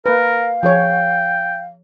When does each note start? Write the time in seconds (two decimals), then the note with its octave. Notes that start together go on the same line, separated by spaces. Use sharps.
0.06 A#3 A#4 B4 F5
0.63 F3 G#4 C#5 G5